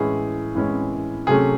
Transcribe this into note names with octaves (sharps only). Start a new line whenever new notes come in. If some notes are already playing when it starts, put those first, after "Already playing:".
Already playing: A2 E3 G#3 C#4 E4 G#4
A2 E3 G#3 C#4 E4
C3 F#3 A3 C#4 G#4